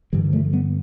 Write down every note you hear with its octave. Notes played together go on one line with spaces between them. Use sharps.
G2 D3 E3 G3
F3 A3
G3 B3